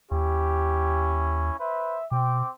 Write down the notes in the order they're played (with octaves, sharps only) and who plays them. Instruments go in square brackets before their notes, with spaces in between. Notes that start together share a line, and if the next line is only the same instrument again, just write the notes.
[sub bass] D#2 [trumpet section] C#4 E4 [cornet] G4
[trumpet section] B4 C5 [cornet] E5
[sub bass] B2 [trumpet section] C4 D6 [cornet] G5